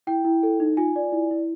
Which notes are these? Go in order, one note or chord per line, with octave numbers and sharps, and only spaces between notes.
E4 G5
E4
A4
D#4
F4 G#5
D5
E4
E4